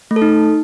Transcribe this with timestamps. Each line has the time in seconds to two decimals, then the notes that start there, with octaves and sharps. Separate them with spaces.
0.11 A3
0.16 A4
0.22 D#4